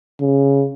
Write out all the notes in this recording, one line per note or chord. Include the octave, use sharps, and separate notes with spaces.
C#3